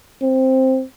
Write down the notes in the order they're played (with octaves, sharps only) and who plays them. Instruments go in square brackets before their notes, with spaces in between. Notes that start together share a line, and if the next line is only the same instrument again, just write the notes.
[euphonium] C4